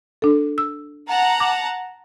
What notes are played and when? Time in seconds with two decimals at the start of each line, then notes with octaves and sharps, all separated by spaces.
0.22 D4 A4
0.58 E6
1.08 F#5 A5 A#5
1.40 D6